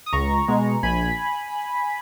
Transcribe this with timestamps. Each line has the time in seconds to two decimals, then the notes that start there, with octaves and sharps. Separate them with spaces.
0.06 D#6
0.13 C#2 A#5 C#6
0.48 B2 G#3
0.83 A#1 G#5 B5